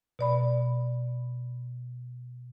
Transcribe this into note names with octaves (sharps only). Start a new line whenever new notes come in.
B2 D5 B5